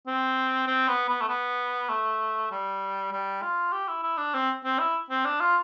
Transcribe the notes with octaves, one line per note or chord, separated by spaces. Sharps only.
C4
C4
B3
B3
A3
B3
A3
G3
G3
F4
G4
E4
E4
D4
C4
C4
E4
C4
D4
F4